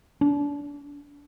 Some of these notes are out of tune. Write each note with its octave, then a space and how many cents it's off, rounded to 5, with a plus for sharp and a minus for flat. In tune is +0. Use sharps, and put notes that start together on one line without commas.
D4 -35